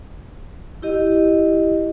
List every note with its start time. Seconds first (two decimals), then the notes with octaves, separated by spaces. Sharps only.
0.82 E4 G4 D#5